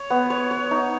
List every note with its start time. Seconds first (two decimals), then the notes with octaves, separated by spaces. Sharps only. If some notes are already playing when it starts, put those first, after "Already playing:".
Already playing: C#5
0.10 B3
0.30 C#5
0.51 C#5
0.71 D#4